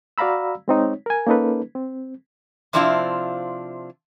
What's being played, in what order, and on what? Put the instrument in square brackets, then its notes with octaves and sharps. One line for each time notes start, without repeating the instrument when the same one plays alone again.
[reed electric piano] F#4 D5 F5 A#5 B5 E6
G#3 C4 D#4 C#5
A#4 G#5
A#3 C#4 D#4 A4 B4
C4
[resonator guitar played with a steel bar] C3 F3 C4 D4 E4 F4